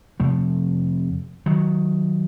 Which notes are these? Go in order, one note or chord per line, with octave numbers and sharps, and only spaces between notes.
F2 C3 F3 A3
D#3 F#3